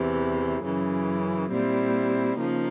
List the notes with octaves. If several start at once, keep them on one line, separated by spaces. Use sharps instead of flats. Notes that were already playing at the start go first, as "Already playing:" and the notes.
Already playing: E2 C3 E3
F#2 C#3 E3
A#2 G3 C4 E4
C#3 F3 A#3 D#4